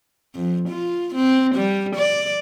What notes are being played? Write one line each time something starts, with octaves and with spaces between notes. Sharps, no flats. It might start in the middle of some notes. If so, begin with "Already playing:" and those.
F2
F4
C4
G3
D5